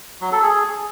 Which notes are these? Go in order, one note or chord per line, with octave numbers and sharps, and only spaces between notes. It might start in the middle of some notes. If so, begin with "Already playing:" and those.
F#3
A4
G#4